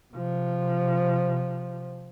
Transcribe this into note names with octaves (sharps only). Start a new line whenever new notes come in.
C3 F3